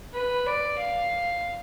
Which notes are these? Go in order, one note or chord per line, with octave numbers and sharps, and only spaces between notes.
B4
D5
F5